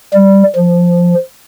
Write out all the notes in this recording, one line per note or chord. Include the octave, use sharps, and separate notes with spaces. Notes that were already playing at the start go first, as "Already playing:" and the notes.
G3
F3